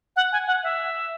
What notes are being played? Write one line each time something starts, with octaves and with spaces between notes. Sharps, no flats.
F#5
G#5
F#5
E5